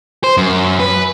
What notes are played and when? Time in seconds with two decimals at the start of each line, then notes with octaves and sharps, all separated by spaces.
0.24 C5
0.37 F#2
0.80 B4